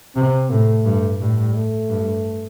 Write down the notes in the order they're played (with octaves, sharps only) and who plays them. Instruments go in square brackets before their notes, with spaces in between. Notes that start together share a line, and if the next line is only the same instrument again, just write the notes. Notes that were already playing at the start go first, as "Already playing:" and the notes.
[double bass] C3 [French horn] C4
[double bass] A2 [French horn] A3
[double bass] G2
[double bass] A2 [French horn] G3
[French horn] A3
[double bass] G2